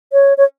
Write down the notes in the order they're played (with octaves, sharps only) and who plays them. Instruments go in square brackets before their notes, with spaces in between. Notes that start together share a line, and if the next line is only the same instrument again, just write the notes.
[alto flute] C#5
C#5